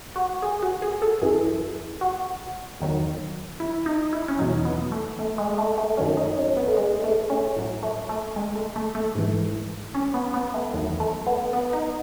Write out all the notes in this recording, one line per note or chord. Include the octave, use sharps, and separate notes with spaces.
F#4
G#4
F#4
G#4
A4
F#2 E3 G#4
F#4
E2 D#3 F#3
E4
D#4
E4
C#4
E2 B2 F#3 D#4
B3
A3
A3
G#3
A3
A3
F#2 D#3 F#3 C#4
D#4
C#4
B3
A3
G#3
A3
C#4
A2 F#3
A3
A3
G#3
A3
A3
A3
G#2 E3
C#4
B3
B3
A3
E2 D#3 F#3
A3
B3
B3
D#4